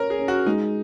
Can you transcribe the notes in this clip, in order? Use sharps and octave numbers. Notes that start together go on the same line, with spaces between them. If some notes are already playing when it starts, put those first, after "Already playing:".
Already playing: C#4 A#4 C#5
G#4
C#4
F#4
G#3 D#4